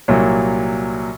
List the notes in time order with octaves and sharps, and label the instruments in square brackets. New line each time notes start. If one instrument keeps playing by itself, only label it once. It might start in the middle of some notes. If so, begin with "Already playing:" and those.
[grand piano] C2 A#2 F#3